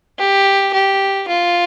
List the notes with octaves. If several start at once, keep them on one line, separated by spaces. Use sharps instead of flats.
G4
G4
F4